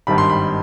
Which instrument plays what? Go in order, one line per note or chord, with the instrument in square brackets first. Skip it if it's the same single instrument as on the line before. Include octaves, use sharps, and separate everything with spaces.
[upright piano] G#1 G2 D#3 G3 B5
C6
B5